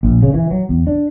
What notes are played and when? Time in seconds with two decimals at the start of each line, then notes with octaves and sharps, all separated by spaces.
0.03 A#1
0.23 C#3
0.34 E3
0.51 F#3
0.69 E2
0.87 D4